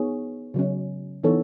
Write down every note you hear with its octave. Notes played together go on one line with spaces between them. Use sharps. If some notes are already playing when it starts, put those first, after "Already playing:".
Already playing: B3 D#4 G#4 C#5
C#3 F#3 C#4
E3 B3 D#4 A4 C#5